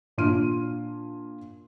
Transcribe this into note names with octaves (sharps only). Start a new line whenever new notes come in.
A#2 D4 F4 C6 F6 D#7